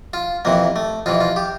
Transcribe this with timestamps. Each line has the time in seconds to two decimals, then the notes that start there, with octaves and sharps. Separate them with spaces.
0.13 F4
0.45 F2 C3 E3 A#3
0.76 A3
1.06 F2 C3 E3 F4
1.21 F4
1.36 G4